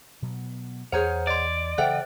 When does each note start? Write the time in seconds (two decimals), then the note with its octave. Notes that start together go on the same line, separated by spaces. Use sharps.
0.22 B2 F#3 B3
0.92 E2 G#4 C5 C#5 F#5 A#5 G6
1.27 D5 D#5 C6
1.78 C#3 E3 A4 C5 E5 F#5 G5 F#6